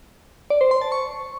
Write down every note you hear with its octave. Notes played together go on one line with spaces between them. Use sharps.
D5
C5
C6
A5
C#6